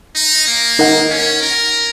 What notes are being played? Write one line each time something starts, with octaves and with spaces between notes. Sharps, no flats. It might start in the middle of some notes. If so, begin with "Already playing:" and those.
D#4
A#3
D#4 A#4 F#5
C#4
A#4